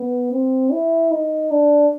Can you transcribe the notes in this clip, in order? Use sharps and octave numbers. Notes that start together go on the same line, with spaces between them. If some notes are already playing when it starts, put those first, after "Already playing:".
Already playing: B3
C4
E4
D#4
D4